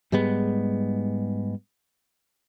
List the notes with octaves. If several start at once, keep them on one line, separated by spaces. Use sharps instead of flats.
G#2 G3 G#3 B3